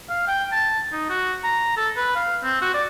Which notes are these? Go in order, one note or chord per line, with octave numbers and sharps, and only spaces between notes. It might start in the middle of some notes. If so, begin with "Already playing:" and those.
F5
G5
A5
D#4
F#4
A#5
A4
B4
F5
C4
F#4
D5